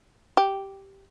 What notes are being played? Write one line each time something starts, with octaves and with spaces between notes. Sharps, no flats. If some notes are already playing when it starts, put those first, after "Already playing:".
G4